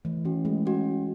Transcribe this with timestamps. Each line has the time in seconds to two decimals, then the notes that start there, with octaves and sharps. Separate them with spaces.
0.05 E3 A3
0.25 E3 C#4 F#4
0.45 G#3 A3
0.65 C#4 F#4